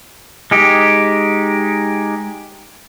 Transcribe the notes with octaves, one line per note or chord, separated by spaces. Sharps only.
G#3 D#4 G4